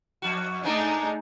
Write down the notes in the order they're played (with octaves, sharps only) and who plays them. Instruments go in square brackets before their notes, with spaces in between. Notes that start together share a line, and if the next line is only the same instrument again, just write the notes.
[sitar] F2 F#4
[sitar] G#2 G#3 D4 [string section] A3 D#4 G#4